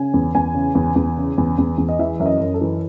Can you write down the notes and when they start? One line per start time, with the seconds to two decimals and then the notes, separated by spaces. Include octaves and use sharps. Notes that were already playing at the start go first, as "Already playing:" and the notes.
Already playing: C#3 G#5
0.14 E2
0.35 E2 G#5
0.55 C#3
0.75 E2
0.96 E2
1.17 C#3
1.38 E2
1.58 E2
1.78 E2
1.89 D#5
1.99 E3 E5
2.20 F#2 E5
2.26 D#5
2.40 F#2
2.54 A4
2.61 E3